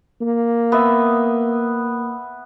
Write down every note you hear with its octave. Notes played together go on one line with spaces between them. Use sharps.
A#3
B3 E5